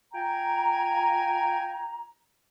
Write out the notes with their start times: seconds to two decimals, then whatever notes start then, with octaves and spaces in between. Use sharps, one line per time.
0.14 F4 G5 G#5 A#5